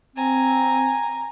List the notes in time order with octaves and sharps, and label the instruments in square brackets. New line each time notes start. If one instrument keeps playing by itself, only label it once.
[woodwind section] C4 [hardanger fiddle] G#5 A#5